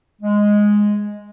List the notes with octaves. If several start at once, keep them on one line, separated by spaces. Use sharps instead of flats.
G#3